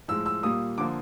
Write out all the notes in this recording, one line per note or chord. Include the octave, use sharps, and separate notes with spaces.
A2 F3 G#3 E6
E6
A#2 G3 A#3 D#6
D3 F3 A#3 D6